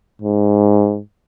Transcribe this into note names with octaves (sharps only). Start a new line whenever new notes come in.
G#2